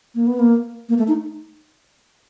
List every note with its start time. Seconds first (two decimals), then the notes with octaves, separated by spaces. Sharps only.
0.15 A#3
0.27 B3
0.39 A#3
0.89 A#3
0.98 A3
1.08 D#4